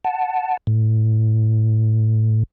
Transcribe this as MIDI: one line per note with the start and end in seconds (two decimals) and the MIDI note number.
0.04 0.57 78
0.04 0.57 81
0.67 2.43 45